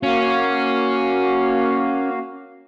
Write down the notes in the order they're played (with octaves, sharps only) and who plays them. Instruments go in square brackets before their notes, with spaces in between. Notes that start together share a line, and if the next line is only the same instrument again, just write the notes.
[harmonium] A#3 F#4 F5 [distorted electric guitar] C#4